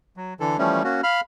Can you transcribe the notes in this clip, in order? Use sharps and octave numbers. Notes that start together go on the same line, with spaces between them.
F#3
D3 E3 A4
E3 F3 G3 A3 C#4
A#3 C#4 F#4
F5 B5 F6